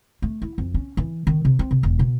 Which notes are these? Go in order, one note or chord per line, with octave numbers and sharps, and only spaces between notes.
A3
E4
F2
C#4
E3
D#3
C3
C4
C3
E1
B2